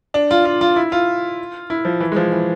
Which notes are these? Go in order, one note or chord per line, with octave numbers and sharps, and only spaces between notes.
D4
F4
F4
F4
E4
F4
E4
F3
E3
G#3
F3
E3